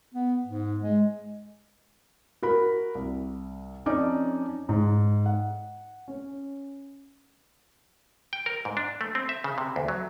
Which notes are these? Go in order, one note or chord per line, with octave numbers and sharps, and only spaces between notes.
B3
G#2
G#3
F#4 A#4 B5
C2
F2 C#4 D#4 D5 D6
G#2
F#5
C#4
G5
A#4
G#2
D4
A3
C4
E5
C#3
C3
D2
F#3